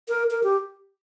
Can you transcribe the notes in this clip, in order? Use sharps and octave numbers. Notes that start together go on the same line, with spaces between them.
A#4
A#4
G4